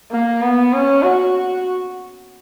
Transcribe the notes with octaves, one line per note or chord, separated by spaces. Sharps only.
A#3
B3
C#4
F#4